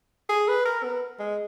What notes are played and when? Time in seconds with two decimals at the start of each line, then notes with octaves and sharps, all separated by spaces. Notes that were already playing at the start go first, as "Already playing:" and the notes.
0.29 G#4
0.48 B4
0.65 A#4
0.83 B3
1.20 G#3